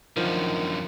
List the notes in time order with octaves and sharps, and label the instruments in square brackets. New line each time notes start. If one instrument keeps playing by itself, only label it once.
[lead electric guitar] F#2 D3 [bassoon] D#3 [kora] F3